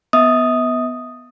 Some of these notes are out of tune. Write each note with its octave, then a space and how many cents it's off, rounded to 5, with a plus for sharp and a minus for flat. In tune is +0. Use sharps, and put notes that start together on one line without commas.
B3 +0 E5 -40 D#6 +0